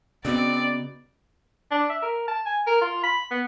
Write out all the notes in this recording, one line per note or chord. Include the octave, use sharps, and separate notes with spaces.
C#3 B3 C4 D#4 F#4 D5
D4
E5
A#4
A5
G#5
A#4
F4
B5
B3